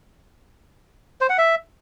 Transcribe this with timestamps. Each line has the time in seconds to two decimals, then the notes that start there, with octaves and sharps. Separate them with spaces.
1.21 C5
1.30 F#5
1.38 E5